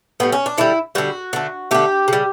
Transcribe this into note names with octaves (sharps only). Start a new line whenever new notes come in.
A2 G3 B3
C#4
D4
D3 G3 E4
D3 G3 F#4
D3 A3
D3 A3 G4
C#3 G3